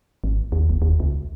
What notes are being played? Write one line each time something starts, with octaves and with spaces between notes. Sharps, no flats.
G#1
D#2
F#1
D#2
C#2